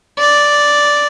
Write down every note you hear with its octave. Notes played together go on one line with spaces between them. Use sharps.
D5